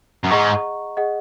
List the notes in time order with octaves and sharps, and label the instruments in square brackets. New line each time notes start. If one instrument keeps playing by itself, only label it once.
[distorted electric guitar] F#2
[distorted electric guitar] G#2 [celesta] G#4 D#5 F#5 A#5 C#6
[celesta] G#4 D#5 F#5